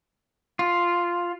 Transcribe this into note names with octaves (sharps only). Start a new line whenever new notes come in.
F4